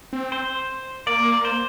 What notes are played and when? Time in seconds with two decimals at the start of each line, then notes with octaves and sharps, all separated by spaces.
0.13 C4
0.32 C5
1.06 A#3 D5
1.45 C5